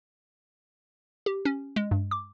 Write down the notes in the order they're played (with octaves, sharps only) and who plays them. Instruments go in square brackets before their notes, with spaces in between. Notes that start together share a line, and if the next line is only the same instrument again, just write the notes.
[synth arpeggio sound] G4
C#4
G#3
G2
D6